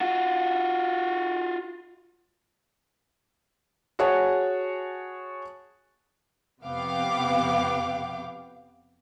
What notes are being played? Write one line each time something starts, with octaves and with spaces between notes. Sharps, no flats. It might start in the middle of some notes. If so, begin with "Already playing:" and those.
F4 F#4
F#4 G#4 C#5 F#5 A5
F2 C3 B3 F5 G5 D6